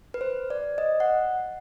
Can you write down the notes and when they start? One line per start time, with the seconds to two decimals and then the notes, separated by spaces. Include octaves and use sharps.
0.14 B4
0.21 C5
0.50 D5
0.78 D#5
1.00 F#5